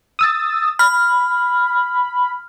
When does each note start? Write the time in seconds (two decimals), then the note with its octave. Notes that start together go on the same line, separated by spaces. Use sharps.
0.19 D#6 E6 A6
0.79 B5 F6